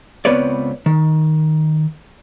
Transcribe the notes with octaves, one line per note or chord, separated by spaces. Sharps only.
C#2 B3 C4 B4 C#5 D5
D#3